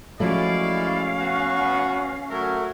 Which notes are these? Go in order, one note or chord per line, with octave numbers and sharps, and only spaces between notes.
F3 F#3 G#3 A3 C#4 E4 D5 F5
B3 F#4
F#3 A3 A#4